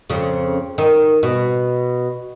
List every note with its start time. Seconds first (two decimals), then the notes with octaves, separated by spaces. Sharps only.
0.10 F2 C#3
0.78 D#3
1.23 B2